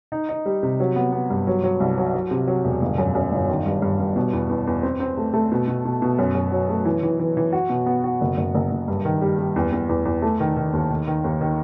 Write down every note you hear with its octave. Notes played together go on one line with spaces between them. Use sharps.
D#4
D#4
G3
C3
F#3
B3
B3
G2
F#3
F#3
C2
F#3
F#3
C3
F#3
E1
G1
F#2
F#2
G1
D#3
G2
G2
G2
B2
E2
E2
E2
C4
C4
A3
A3
B2
B2
B2
B2
F#2
F#2
F#3
A3
E3
E3
E3
E3
F#4
B2
B3
F#4
F#1
F#1
F#1
F#1
G2
D#3
G3
G3
E2
E2
E2
E2
A3
D#3
D#3
D#2
D#3
D#3
D#2
D#3